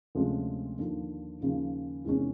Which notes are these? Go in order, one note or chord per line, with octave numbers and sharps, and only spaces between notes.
D2 C3 F3 G#3 C#4
D#2 D3 F3
D#2 C#3 F3
E2 C3 D#3 G#3 C#4